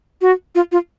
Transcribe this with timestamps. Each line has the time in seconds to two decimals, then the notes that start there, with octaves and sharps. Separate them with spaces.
0.21 F#4
0.55 F4
0.72 F4